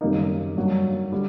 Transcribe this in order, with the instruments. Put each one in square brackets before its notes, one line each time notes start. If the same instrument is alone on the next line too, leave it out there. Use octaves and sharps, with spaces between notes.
[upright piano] F#2 D#3 G3 A#3 D#4
G2 F#3 A#3
D3 G3